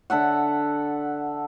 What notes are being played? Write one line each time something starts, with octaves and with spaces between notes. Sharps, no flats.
D3 A4 E5 F#5